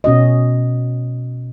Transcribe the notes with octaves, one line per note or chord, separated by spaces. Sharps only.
B2 C#4 F#4 D#5